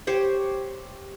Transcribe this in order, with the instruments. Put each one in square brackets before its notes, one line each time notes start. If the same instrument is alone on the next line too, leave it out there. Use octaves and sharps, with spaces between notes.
[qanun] G4 C5 C#5